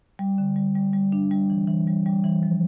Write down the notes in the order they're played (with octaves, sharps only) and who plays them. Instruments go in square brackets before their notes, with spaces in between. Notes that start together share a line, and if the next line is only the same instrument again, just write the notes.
[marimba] G3
D3
G3
G3
G3
D4
G3
E3
E3
G3
G3
E3
F3